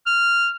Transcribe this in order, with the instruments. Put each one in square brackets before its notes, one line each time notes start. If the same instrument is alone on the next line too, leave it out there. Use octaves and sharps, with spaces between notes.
[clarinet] F6